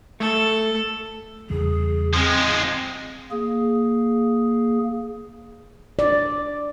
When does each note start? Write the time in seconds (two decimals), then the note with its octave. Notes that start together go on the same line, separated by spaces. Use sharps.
0.20 A3 A4
1.50 E2 C#3 G3 G#4
2.14 F3 G#3 C4
3.31 A#3 G#4
5.99 D5